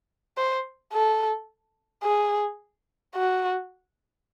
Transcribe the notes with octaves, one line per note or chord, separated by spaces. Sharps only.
C5
A4
G#4
F#4